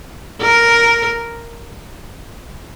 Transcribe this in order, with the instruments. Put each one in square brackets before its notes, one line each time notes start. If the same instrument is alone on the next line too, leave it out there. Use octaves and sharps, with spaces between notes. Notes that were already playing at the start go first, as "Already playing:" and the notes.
[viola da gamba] A#4